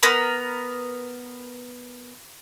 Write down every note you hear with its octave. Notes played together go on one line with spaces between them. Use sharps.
B3 A#4 B5